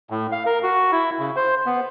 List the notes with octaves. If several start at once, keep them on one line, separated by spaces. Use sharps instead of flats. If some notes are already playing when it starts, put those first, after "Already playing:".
A2
F5
A#4
F#4
E4
C#3
C5
B3